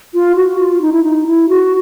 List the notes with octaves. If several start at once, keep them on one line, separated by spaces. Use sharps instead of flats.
F4
F#4
F4
D#4
E4
D#4
E4
F#4